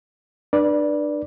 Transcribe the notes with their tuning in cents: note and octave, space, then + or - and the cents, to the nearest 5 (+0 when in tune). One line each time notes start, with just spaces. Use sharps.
D4 +30 B4 -30 D5 +0